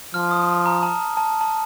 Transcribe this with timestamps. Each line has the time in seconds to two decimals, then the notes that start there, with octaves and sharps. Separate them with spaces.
0.14 F3 F6
0.31 D#6
0.66 A#5
0.83 A5
1.17 A5
1.41 A5